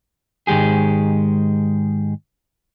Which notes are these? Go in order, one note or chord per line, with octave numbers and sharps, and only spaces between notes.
G#2 D#3 G#3 G4 G#4